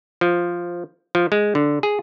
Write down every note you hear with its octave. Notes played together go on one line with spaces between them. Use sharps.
F3
F3
G#3
D3
G#4